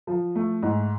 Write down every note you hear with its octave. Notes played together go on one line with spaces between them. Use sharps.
F3
A3
G#2